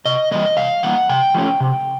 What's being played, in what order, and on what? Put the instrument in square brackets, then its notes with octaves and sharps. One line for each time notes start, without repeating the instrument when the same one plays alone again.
[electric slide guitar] C3 D#5
E3 G3 A#3 D#5
C3 F5
E3 G3 A#3 F#5
C3 G5
F3 A3 C#4
C3